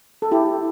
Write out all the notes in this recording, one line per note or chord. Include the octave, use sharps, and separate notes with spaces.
A4
E4 G4